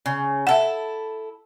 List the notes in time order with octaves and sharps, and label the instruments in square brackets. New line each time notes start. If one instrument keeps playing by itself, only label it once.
[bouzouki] C#3
[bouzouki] E4 A4 [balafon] E5 F#5